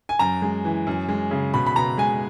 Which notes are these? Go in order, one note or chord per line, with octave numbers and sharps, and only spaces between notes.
G#5
F#2 A#5
G#3
E3
F#2
G#3
C#3
B2 B5
B5
B2 A#5
G#3 G#5